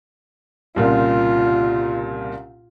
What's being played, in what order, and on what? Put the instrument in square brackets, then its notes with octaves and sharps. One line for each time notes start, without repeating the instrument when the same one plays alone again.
[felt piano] C2 A#2 C#3 [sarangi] F4